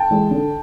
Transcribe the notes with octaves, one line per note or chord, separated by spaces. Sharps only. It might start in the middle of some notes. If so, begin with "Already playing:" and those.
Already playing: G5 A5
E3 G#3
D3